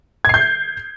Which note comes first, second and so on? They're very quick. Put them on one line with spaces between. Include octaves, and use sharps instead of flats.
G#6 C7 G6